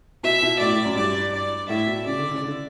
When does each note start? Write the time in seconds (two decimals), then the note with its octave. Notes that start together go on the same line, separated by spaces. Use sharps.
0.23 B2 E5
0.42 B2
0.59 A2 D5
0.73 A2
0.84 F#2
0.96 G2 D5
1.32 D5
1.69 A2 E5
1.86 B2
2.05 C#3 D5
2.18 D3
2.30 C#3
2.44 D3